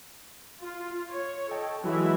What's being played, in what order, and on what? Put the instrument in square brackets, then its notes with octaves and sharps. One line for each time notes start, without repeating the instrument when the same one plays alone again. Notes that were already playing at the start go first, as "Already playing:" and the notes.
[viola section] F4
C#5
[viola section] A4 [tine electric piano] D#5 G5 A5
[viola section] E3 G#3 E5 [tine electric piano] F#3 E4 F#4